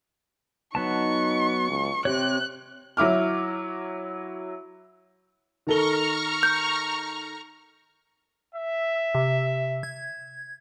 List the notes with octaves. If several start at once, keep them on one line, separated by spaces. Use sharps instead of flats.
F#3 B3 D#4 A5 C#6
C#2
C3 C4 G4 C#5 F#6
F#3 E4 D6 F6
D#3 A4 A#5 C#6 F6 G7
G6
E5
C3
G#6